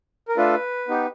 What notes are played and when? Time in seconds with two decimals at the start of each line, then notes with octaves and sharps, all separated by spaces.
0.28 A#4
0.37 A3 D4 F4 A4 B4
0.88 B3 D#4 G4